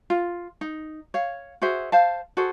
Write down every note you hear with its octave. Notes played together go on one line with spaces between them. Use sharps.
F4
D#4
C#5 F5
F#4 G#4 C5 E5
C5 F5 A5
F#4 G#4 A4 C5